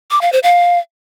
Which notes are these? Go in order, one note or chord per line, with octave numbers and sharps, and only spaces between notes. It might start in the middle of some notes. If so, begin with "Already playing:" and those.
D6
F5
C5
F5